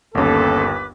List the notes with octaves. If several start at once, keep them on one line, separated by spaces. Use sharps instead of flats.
G1 D#2 A#3 C#4 A4 B4 D6